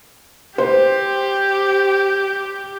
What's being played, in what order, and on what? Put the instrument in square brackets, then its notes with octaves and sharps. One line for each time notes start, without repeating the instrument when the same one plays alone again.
[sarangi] G4 [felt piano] C5